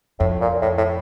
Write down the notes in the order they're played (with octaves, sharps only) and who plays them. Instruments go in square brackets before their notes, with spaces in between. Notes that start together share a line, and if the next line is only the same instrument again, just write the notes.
[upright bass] F2 [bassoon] A2
[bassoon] A#2
A2
A2